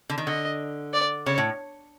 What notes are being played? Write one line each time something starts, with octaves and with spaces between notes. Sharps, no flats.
D3
D#3
D3 D#5
D5
C#3 C#5
A2